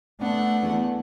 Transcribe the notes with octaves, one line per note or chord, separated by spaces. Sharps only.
A3 B3 D4 F#5
E2